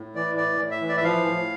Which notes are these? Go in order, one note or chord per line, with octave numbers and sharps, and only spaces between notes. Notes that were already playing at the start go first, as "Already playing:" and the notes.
Already playing: A2
E3 D5
A2 D5
A2
E5
E3
D5
E5
F3 F5
A2